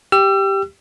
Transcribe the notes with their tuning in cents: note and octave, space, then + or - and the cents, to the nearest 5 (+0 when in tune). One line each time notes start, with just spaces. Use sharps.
G4 +0 E6 +40